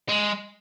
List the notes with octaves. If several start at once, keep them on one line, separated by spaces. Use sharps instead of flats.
G#3